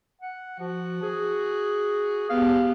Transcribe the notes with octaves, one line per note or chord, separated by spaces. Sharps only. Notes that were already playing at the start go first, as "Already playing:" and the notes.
F#5
F3 F#4
G#4
B3 G4 F5